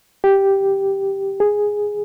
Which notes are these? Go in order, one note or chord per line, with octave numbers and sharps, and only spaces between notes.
G4
G#4